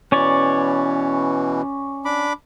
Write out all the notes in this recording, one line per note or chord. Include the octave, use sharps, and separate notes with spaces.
B2 E3 C#4 C#5 D5
D4 B5 D6